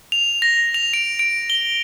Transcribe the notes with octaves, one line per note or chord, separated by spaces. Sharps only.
F7
A#6
F7
D7
D7
G7